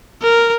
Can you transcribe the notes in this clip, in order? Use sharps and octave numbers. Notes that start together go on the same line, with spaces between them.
A#4